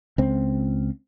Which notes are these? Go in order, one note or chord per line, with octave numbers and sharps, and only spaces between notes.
C#2 C4